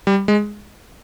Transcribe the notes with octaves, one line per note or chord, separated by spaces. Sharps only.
G3
G#3